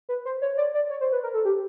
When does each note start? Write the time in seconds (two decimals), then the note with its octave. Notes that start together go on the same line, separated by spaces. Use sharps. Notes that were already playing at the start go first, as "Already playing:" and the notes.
0.09 B4
0.25 C5
0.42 C#5
0.57 D5
0.74 D5
0.90 C#5
1.01 C5
1.12 B4
1.23 A#4
1.34 A4
1.45 G4